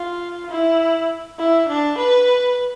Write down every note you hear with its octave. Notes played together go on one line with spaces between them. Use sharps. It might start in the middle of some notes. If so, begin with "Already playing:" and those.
Already playing: F4
E4
E4
D4
B4